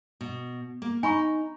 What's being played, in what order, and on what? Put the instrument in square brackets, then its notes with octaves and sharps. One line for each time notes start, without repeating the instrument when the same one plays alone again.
[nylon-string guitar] B2
A#3
[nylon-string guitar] D#4 [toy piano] G#5 B5 C#6